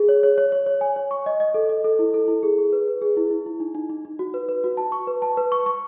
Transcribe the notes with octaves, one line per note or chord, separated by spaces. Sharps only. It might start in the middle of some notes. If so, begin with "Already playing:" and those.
Already playing: G#4
C#5
C#5
C#5
C#5
C#5
G#5
C#5
C#6
D#5
D#5
A4
D#5
A4
E4
A4
E4
G#4
G#4
B4
B4
G#4
E4
E4
E4
D#4
D#4
D#4
D#4
F#4
B4
B4
F#4
A5
C#6
B4
A5
B4
C#6
C#6